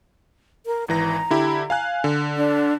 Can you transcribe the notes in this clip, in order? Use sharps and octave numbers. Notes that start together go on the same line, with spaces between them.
A#4
G#1 E3 A#5 A#6
D3 E4 G4
F5 G#5 F#6
D3
D4